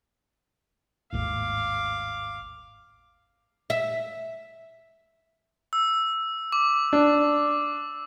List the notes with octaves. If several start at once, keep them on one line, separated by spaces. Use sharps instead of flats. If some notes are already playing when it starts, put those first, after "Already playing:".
G#1 D#2 A2 F5 D6
E5
E6
D6
D4